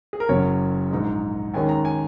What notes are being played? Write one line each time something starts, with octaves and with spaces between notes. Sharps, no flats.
G#4
A#4
F#1 F#2 F#3 C#4 C#5
A#1 G#2 G#3
D#2 D#3 G#3 C#4 G#5
A#5
G#5